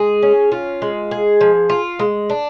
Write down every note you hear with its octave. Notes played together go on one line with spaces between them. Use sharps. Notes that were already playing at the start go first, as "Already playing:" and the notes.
Already playing: G#3 G#4
C#4
F4
G#3
G#4
F3
F4
G#3
D4